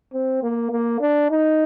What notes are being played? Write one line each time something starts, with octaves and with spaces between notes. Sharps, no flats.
C4
A#3
A#3
D4
D#4